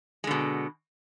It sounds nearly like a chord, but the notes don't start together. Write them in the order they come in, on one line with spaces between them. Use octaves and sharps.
G#3 D3 B2